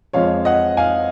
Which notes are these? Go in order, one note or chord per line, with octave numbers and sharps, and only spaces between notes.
F2 F3 G#3 C#5 F5
D#5 F#5
F5 G#5